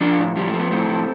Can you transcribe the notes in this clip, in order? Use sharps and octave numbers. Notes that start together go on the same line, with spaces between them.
F3 D4 F4
A2
F3 G3
A3
F3
B3
A2 A3 C4
F3